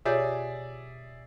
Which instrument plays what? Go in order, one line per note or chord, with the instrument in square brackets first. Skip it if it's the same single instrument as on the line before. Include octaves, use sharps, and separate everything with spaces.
[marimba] B2 G4 G6 [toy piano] F4 C#5 [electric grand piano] G#4 D5 E5